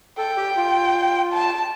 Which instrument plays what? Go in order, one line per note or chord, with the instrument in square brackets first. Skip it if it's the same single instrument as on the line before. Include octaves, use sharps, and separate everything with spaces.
[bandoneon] A4 [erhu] G5
[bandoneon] G4
F4
[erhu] A5